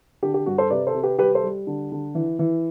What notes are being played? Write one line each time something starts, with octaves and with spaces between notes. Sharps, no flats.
D3 G4
G4
G2 F#4
A4 C5
C3 B4 D5
A4 C5
C3
G4 B4
G3 G4 B4
A4 C5
G3
D3
D3
E3
E3